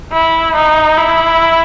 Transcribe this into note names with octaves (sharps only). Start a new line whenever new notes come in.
E4
D#4
E4